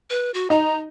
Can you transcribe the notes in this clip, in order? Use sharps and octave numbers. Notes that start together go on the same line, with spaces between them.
B4
F#4
D#4 A#5